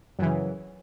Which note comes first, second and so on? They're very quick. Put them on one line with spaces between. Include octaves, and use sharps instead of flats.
F#2 E3 C#3